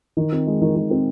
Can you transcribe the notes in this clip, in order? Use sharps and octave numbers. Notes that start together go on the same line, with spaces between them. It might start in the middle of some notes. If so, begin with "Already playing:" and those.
D#3
C4
G#3
D#3
D#3
C4